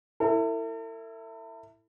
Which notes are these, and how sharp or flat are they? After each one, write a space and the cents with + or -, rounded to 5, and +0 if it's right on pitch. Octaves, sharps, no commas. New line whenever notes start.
E4 +0 A4 +45